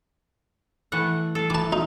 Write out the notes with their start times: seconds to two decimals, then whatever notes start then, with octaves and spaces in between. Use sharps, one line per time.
0.92 E3 A3 F#5
1.35 A4 F5
1.50 E3 A5 D6
1.72 D#4